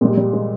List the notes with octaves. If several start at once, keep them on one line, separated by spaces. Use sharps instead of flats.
A#2 G3 G#3
G3
G#3